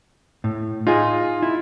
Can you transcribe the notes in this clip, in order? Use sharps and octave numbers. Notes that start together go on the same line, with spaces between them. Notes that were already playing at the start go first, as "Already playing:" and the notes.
A2
D#4 F4 G#4
E4